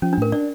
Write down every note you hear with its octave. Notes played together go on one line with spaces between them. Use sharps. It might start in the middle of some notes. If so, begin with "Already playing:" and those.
F3 C#4
D4
A2 A#4
D4 D5